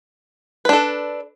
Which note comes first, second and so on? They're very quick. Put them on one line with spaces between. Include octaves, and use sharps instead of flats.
B4 D4 A4